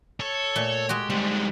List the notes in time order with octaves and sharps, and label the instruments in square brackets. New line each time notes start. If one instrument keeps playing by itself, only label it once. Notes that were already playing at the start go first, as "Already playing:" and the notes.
[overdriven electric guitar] A4 [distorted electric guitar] C#5
[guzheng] A#2 A3
[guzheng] G#3 F#4 [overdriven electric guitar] G4
[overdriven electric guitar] G#2 D3 [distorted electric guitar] G3 G#3 [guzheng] C4